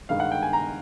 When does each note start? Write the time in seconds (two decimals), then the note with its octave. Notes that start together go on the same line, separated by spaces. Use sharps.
0.09 G2 D#3 G#3 F5
0.20 F#5
0.32 G5
0.42 G#5
0.53 A#5